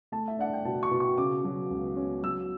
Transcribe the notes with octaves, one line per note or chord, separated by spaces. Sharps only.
A3 A5
E5
D4 F#5
G5
B2 A5
C#6
B2
C#6
C#3 D6
F#3
C#2
C#4
F#3 E6